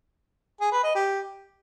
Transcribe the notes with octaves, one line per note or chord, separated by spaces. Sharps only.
G#4
B4
D#5
G4